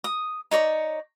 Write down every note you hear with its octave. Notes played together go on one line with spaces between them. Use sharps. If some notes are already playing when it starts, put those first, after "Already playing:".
D#6
D#4 C#5 D5 C#6